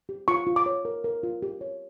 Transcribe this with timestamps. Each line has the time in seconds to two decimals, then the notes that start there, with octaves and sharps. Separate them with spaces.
0.09 G4
0.28 F4 C#6
0.47 F4
0.56 D6
0.66 C#5
0.85 A#4
1.04 A#4
1.23 F4
1.42 G4
1.61 C#5